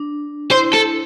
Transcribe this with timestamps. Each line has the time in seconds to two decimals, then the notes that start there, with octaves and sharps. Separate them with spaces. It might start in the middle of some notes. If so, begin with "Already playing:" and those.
Already playing: D4
0.51 E4 C5
0.74 A4